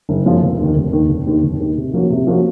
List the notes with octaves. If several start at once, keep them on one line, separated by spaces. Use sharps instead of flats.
F#1
F#2 F3 A#3 F4
F1
D#2 D#3
F1
D#2 D#3
F1
D#2 D#3
F1
D#2 D#3
C3
F3 A#3 C#4 F#4
C3
F3 A#3 C#4 F#4